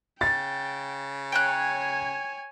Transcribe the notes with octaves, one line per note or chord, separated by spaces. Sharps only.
C#3 G5 A6
C#5 G5 G#5 A#5 F#6